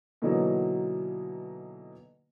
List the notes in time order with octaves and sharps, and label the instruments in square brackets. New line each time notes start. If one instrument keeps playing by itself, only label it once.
[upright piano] B2 D3 E3 F#3 A#3 D#4